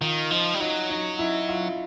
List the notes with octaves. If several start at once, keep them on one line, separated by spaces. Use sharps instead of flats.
D#3 F4
F3 D#4
G3
F#3 D#4
D#4
E4
F4